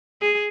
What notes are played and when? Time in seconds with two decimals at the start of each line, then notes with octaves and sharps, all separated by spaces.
0.21 G#4